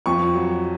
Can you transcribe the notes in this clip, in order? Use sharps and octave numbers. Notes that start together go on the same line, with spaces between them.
F2 C#6
F#3